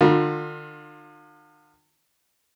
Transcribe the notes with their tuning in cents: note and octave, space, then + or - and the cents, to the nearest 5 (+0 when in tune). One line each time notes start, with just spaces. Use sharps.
D3 +45 F4 +30 B5 -40